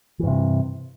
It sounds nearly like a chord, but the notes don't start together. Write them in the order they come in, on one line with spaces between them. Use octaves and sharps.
E3 G2 C3